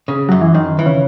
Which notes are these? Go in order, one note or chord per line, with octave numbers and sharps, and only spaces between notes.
C#3
F#2 F#3
E3
F#2 D#3
E3
C#3